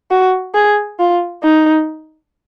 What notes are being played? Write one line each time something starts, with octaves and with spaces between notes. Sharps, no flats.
F#4
G#4
F4
D#4